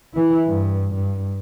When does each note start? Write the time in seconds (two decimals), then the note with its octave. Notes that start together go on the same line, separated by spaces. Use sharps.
0.14 E3 E4
0.48 G2
0.94 G2